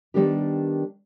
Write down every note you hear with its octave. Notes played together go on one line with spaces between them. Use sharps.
D#3 F3 G3 B3 D4 G4